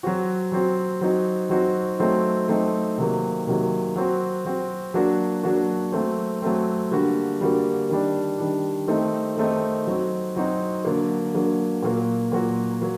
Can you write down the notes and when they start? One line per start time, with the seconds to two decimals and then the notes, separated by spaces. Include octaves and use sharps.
0.03 F#3 C4 F#4
0.52 F#3 C4 F#4
1.01 F#3 C4 D#4 F#4
1.50 F#3 C4 D#4 F#4
1.99 F#3 A3 C4 D#4
2.48 F#3 A3 C4 D#4
2.98 C3 D#3 F#3 A#3
3.47 C3 D#3 F#3 A#3
3.96 F#3 C4 F#4
4.45 F#3 C4 F#4
4.94 F#3 A#3 D4 F#4
5.43 F#3 A#3 D4 F#4
5.92 F#3 A3 C4
6.42 F#3 A3 C4
6.91 D3 G3 A#3 F#4
7.41 D3 G3 A#3 F#4
7.90 D#3 G3 D4
8.38 D#3 G3 D4
8.88 D#3 A3 C4 D#4
9.37 D#3 A3 C4 D#4
9.87 F#3 C4 D#4 F#4
10.36 F#3 C4 D#4 F#4
10.85 D3 F#3 A#3
11.34 D3 F#3 A#3
11.83 A#2 F#3 A#3 F#4
12.32 A#2 F#3 A#3 F#4
12.82 F#3 A#3